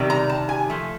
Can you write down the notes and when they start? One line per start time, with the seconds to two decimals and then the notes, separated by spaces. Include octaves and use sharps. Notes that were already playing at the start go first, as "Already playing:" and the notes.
Already playing: C3 D#3 G3
0.10 A#5
0.30 A5
0.49 G#5
0.70 F3 A3